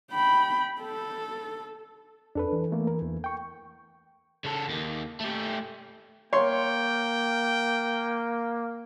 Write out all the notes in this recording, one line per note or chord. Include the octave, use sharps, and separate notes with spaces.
G5 B5
A4
F2 D4 A4 B4
E3
A3 A#3
A#4
E2
G5 C#6
C#3 A4
D#2 D#3
A3 G4
A#3 C#5 G5 C6